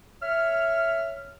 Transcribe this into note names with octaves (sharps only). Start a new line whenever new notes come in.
C#5 E5 F6